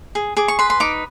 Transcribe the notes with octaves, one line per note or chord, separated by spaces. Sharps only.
G#4
G#4 D6
C#6
B4 C6
C6
D#4 D6